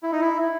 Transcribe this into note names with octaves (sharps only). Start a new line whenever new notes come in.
E4
D#4
E4